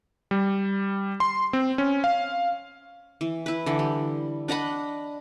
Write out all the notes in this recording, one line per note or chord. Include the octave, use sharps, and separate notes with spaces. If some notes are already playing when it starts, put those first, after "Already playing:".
G3
C6
C4
C#4
F5
E3
E4 B4
D3 E3
G3
D4 D#5 F#5 B5